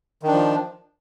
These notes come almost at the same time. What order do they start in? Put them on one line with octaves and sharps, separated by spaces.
D#3 D4 F3